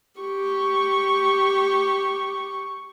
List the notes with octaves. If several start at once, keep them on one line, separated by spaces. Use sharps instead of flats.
G4 C#6